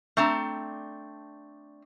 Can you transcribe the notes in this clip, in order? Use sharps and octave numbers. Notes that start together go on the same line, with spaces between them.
A3 C4 D4 A#5